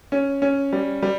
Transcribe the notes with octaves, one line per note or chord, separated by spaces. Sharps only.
C#4
C#4
G3
G3